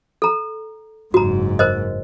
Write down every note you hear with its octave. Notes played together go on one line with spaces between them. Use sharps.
A4 A#5
F#1 G#2 F#4 A#5
A#4 C5 D#5